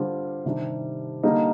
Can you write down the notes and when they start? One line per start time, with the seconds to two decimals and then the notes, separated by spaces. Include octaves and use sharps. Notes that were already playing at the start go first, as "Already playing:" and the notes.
Already playing: D3 G3 C4 F4
0.45 C3 D#3 G3 D4
1.23 D3 G3 A#3 D#4